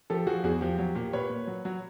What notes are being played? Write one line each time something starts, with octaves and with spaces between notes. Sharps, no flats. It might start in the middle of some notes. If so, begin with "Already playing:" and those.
F3 G4 A4
F3 F#4 G#4
E2 F#4 G#4
F3 G4
F#3 G4
A#2 G4
A#2 B4 C#5
A#2
F#3
F#3